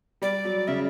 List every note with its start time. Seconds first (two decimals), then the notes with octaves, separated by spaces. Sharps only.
0.22 G3 D5
0.45 F#3
0.68 C#3 E5